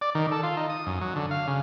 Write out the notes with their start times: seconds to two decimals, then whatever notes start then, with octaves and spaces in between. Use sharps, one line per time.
0.01 D5
0.15 D#3
0.32 A4
0.43 F4
0.57 D#4
0.70 D#6
0.87 F#2
1.01 F#3
1.16 D3
1.31 F5
1.47 C#3